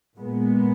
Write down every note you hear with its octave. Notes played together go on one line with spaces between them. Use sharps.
A#2 G#3 B3